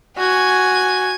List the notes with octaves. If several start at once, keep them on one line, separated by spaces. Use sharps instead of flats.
F#4 G#5 G#6